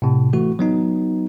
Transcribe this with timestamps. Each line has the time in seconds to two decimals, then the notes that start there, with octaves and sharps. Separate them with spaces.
0.02 A2 C3
0.33 E3 A3 F#4
0.59 F#3 B3 D#4